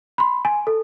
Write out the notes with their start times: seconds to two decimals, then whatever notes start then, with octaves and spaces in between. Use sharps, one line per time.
0.18 B5 C6
0.45 G#5
0.67 A4